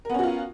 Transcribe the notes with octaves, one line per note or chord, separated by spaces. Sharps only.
B3 C#4 F4 F#4 A#4